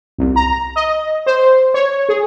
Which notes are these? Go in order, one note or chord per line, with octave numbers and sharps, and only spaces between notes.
C2
A#5
D#5
C5
C#5
G#4